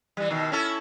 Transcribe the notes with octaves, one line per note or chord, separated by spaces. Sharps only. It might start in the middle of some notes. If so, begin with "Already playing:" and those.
E3 G3
B2 D#3
C#4 E4 A4